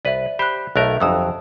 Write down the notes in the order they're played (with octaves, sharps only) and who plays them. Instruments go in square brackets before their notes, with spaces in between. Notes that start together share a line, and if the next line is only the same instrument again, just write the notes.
[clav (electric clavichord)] C2 B4 [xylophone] D5 E5
[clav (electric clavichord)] G4 C5 [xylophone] B5 F#6
[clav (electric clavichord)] B1 A3 A#4 [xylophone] E5 A5 F#6
[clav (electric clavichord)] G1 F2 F#3 [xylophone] A5 D#6 E6